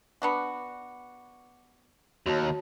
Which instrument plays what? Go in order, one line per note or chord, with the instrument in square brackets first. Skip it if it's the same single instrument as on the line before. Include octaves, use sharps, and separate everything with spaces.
[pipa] B3 D4 F#4 [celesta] D6 C#7
[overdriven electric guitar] D#2 [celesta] F#4 C#5 A5